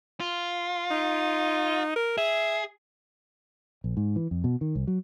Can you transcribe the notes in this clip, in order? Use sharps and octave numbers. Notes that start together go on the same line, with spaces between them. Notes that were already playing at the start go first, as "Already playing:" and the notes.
F4
D#4
A#4
G#4 E5
A#1
G#2
E3
F2
B2
D#3
C2
F#3